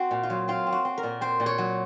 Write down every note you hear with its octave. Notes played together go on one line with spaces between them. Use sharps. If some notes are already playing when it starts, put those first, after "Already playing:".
Already playing: C4 F#4
A#2
F4
F#3
C4 F4
C4
F#4
C4
A#4
A#2
C4 C5
A#2
C#5
F#3